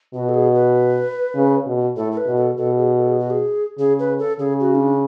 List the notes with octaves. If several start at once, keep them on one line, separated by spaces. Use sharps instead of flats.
B2 F#4
A4
G#4
B4
C#3
B2
A2 A4
A4
B4
B2
A4
B2 A4
G#4
A4
G#4
F#4
G#4
C#3 G#4
B4
A4
C#3 G#4
F#4
C#4
D4